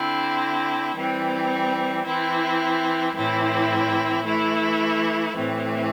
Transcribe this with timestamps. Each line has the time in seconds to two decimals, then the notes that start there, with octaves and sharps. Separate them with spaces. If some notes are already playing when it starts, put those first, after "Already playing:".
Already playing: D3 C4 E4
0.94 E3 G3 C4
2.04 E3 C4 E4
3.15 A2 E3 C4 E4
4.25 E3 A3 E4
5.35 A2 E3 A3 C4